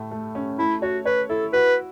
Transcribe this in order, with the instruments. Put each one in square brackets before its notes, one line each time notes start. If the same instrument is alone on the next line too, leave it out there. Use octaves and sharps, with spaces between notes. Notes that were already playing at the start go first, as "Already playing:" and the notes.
Already playing: [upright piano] A2 A3
A3
C#4
[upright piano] A3 [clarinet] E4
[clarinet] F#4 [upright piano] C#5
[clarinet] B4 [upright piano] C#5
[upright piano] E4 [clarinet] A4
[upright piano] F#4 [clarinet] B4